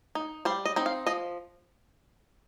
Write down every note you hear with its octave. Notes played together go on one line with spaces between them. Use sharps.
D#4
G3 C5
D#5
C4 D#4
F5
F3 D#5